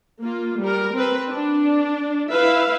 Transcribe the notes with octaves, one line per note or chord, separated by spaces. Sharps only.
A#3 F4
G3 A#4
C4 B4
D4
E4 B4 E5 F5